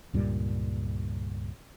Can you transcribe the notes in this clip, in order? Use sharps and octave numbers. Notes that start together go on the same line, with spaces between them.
C#2 G2 A#2 G3